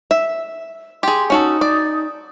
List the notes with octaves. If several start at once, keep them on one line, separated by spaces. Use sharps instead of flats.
E5
G4 G#4 C6
C#4 D#4 F#4 A4
D5